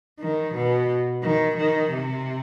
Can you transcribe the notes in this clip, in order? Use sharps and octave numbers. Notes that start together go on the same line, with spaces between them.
D#3
B2
D#3
D#3
C3